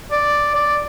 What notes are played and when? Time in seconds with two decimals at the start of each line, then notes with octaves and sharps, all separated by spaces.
0.12 D5
0.55 D5